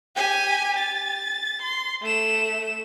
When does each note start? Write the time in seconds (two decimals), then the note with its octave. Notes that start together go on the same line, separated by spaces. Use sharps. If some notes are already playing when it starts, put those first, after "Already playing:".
0.16 G4 G#5
0.79 A6
1.62 C6
2.02 A3 E7